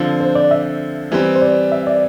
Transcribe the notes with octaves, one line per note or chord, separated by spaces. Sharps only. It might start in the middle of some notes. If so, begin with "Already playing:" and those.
Already playing: D3 F3 C4
C5
D5
E5
E3 G3 C4
C5
D5
E5
D5